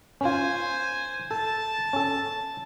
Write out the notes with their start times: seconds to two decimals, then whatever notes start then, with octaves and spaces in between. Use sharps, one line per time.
0.21 C#4 F4 C5 G#5
1.31 A4 A5
1.93 C#4 A4